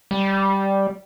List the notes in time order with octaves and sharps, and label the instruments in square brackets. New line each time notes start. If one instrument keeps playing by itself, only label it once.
[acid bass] G3